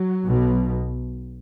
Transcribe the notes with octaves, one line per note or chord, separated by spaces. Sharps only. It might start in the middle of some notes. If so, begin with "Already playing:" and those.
Already playing: F#3
B1 B2